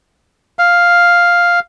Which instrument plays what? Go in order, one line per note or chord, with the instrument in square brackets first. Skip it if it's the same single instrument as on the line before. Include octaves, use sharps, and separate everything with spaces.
[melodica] F5